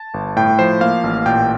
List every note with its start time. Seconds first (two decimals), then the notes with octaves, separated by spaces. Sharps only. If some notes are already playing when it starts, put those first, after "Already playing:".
Already playing: A5
0.14 G1
0.36 A2 G5
0.59 F3 C5
0.81 A#3 F5
1.04 A1
1.26 A#2 G5